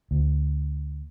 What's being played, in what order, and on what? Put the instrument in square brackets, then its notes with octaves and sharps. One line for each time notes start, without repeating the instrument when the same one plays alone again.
[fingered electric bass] D2